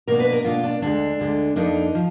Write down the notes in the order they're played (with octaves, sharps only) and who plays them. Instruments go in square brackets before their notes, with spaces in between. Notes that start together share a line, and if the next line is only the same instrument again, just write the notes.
[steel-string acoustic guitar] B2 A#3 D4 A#4
B4
A#4
B2 A#3 D4 F4
D4
D2 D3 G#3 D4
D2 D3 G#3
F2 F3 A#3 D4 D#4
F3